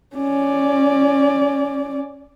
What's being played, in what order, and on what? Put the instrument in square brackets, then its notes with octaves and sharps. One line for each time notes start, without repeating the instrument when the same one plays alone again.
[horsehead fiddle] C#4 D5